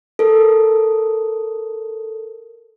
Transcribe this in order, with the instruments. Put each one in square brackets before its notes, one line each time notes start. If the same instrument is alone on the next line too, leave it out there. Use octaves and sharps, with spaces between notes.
[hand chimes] A4 A#4